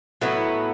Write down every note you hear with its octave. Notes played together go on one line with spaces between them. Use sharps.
A2 F#3 B3 E4